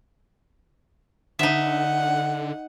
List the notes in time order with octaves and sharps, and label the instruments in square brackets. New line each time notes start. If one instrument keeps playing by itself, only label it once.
[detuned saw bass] D3 [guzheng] D#4 E5 [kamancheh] F#5